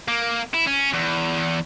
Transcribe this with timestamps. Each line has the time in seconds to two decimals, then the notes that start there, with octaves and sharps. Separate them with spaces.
0.08 A#3
0.54 E4
0.67 C#4
0.93 E2